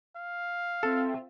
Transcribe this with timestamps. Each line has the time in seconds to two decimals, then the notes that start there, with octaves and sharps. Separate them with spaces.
0.16 F5
0.83 C4 F4 A4 E5